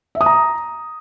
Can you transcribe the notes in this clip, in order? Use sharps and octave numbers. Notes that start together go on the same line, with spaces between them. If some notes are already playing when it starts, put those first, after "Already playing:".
E5
D#6
A#5